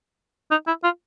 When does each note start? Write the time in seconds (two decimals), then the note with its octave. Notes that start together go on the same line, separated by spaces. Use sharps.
0.51 D#4
0.67 E4
0.84 F4